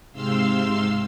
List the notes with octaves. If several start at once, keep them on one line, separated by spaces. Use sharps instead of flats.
G#2 C3 F5 C6 E6